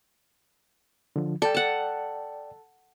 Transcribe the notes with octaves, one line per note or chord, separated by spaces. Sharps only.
D3 F3
A4 D5 G5
F#5 A5